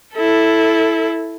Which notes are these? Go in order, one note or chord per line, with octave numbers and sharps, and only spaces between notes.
E4 A4